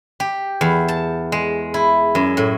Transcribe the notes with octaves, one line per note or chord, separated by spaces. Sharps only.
G4
E2
A5
G#3
E4
F#2
A2